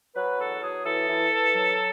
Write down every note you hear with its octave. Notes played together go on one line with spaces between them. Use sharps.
F#3 B4
E2 A4
F#3 G#4
E3 A4
E3
E3
F#3